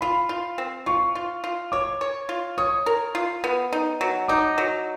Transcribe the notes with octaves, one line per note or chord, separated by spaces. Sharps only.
F4 B5
F4
C4
F4 C#6
F4
F4
C#5 D6
C#5
F4
C#5 D#6
A#4
F4
B3
D#4
F#3
D#4 D6
F#3